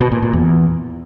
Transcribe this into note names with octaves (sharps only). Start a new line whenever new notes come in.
B2
A#2
A#2
E2